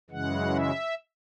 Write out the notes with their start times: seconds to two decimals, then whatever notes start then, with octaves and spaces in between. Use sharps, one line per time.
0.10 F#2 C#3 E3 G#3 F#5
0.55 E5